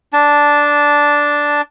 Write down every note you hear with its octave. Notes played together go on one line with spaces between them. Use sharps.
D4 A5